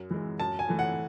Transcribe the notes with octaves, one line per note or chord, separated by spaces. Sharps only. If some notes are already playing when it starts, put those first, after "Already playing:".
Already playing: F#2
E3 G#3
F#2 A5
G#5
E3 A3
F#5